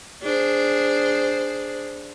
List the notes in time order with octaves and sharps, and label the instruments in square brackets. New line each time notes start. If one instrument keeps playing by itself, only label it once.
[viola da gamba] D4 G#4 C5